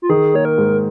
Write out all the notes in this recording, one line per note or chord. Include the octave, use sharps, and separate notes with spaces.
F4
D#3 G#4
A#3 C#5
A#4
G#2